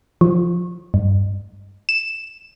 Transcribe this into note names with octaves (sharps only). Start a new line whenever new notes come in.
F3
G2
E7